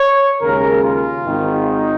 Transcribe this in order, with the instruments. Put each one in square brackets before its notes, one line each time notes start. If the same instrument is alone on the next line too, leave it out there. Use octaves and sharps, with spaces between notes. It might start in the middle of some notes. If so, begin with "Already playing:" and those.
Already playing: [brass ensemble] C#5
D#2 C#3 G#3 A#4
F4
G#1 G#2 D#3
D#4